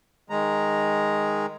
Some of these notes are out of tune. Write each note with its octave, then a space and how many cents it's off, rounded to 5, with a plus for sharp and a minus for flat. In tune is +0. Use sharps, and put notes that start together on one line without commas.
D#3 +0 G#3 +0 A#5 +0